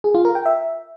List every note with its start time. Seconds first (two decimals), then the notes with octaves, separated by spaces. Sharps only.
0.04 G#4
0.15 F4
0.25 A#4
0.35 G5
0.46 E5